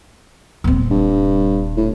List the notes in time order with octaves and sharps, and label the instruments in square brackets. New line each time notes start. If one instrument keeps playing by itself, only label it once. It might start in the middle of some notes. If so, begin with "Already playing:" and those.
[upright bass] D#1 C4
[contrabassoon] G2
A2